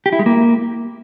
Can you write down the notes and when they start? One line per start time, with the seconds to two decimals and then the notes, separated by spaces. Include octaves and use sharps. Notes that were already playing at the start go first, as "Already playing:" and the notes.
0.06 G4
0.13 E4
0.19 G#3
0.26 A#3